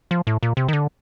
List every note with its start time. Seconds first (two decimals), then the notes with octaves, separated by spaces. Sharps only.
0.11 F3
0.27 A2
0.43 A#2
0.57 C3
0.68 D#3
0.73 D3